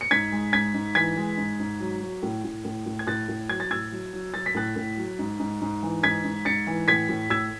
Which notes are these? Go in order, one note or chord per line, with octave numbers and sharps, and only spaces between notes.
C#7
G#2 G#6 B6
G#3
G#2 G#6 B6
G#2
E3 G#6 B6
G#3
G#2
G#2
F#3
F#3
A2
A2
A2
A2
G#6
A2 F#6 A6
A2
F#3 G#6
A6
A2 E6 G#6
F#3
F#3
F#3 A6
B6
A2 F#6 A6
A2
F#3
G#2
G#2
G#2
E3
G#2 G#6 B6
G#2
G#2 A6 C#7
E3
A2 G#6 B6
A2
A2 E6 G#6